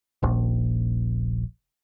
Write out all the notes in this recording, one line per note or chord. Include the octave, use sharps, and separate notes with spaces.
D#1 A#1